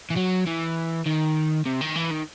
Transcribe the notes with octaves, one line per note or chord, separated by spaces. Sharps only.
E3
F#3
E3
D#3
C3
D#3
E3
D#3